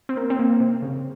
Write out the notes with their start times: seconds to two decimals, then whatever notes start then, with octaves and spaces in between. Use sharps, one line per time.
0.09 C4
0.17 A#3
0.30 C4
0.39 A#3
0.60 C3
0.82 C#3